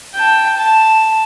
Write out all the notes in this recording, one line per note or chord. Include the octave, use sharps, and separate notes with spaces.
G5 A5
A5